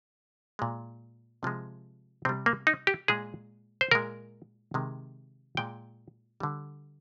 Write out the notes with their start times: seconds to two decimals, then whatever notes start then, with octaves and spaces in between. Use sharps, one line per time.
0.59 A#2 G#3
1.43 C3 F3 G#3
2.25 C3 G3 C4
2.46 A#3
2.67 D#4
2.87 G4
3.08 A#2 G#3 G#4
3.81 C5
3.91 A#2 G#3 A#4
4.74 C3 D#3 G#3
5.57 A#2 G#3 G5
6.40 D3 G3